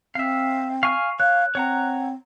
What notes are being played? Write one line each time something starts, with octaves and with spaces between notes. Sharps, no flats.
C4 E5 F5
F5 G#5 C#6 F6
C#5 F5 F#6
C4 C#5 F#5 A#5